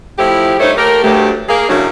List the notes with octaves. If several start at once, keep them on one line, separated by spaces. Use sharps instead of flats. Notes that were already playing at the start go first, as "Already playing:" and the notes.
A2 F3 E4 G4
G2 A3 D#4 C5 C#5
A3 A#3 G4 A#4
D2 G2 F#3 A3 G4
A#3 G#4
F#2 A2 C#3 F#3 D4